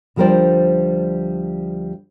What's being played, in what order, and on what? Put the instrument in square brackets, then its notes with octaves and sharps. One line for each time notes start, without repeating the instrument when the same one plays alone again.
[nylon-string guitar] D2 F3 G3 A#4 C5 D5